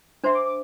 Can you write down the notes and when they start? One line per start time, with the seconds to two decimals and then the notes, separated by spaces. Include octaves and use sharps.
0.24 D4 C5 E5 C6
0.35 D6
0.46 D6